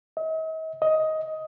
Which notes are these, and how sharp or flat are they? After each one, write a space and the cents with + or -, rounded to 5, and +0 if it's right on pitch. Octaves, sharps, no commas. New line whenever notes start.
D#5 +45
D#5 +15